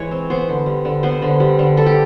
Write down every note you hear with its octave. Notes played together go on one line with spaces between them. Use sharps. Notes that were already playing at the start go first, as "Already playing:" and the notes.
Already playing: E3 G#3 C#5
C4
B3 C5
D3
G3
D3
B3 C5
D3
G3
D3
G3 A4
G4